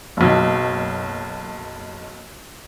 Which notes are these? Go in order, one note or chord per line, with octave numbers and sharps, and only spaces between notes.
F#1 B1